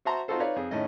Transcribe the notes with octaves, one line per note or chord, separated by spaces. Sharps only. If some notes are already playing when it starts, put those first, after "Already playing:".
F#4 C5 E5 A5 A#5 C6
C4 D#4 F4 F#4 A4 C5
D#4 B4 C#5 D5 F5
F2 G#4
A2 D#3 A3 C#4 D#5